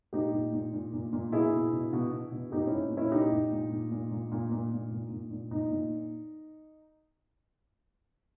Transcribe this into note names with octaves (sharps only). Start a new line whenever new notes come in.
A#2 D#4 G4
A#2
A#2
A#2
A#2
A#2
B2 E4 G#4
B2
B2
B2
B2
B2
A#2 D#4 G4
A#2 C#4 E4
A#2
C#4 E4
A#2 D#4 G4
A#2
A#2
A#2
A#2
A#2
A#2
A#2
A#2
A#2
A#2
A#2
A#2 D#4
A#2